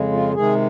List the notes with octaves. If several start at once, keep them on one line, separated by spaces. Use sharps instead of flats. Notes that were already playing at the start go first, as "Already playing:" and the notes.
Already playing: F2 C#3 G#3
F4
C3 D#3 G#3 G#4